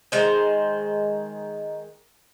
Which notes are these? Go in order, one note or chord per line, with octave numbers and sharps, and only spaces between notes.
D#3 G#3 C5